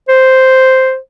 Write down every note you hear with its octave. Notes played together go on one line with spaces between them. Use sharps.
C5